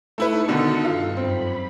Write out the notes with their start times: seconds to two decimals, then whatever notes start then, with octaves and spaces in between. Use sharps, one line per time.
0.18 A3 D#4 E4 A4 B4 C#7
0.48 B2 D3 D#3
0.85 G2 F4
1.17 F#2 C4 B5